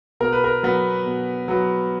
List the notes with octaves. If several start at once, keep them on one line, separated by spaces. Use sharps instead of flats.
B2 A#4
B4
A#4
F#3 B3
B2
F#3 B3